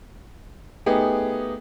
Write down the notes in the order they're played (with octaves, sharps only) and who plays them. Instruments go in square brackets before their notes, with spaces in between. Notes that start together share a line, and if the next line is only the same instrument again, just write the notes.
[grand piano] A3 B3 D#4 G4 G#4